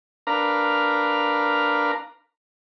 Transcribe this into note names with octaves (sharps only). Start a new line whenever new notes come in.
D4 A#4 B4 F5 A#5